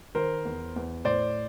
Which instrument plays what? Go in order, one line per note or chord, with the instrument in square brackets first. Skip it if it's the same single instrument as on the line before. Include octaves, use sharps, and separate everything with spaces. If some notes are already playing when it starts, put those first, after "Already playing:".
[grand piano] D#3 A#4 C5
E2
E2
A2 C5 D5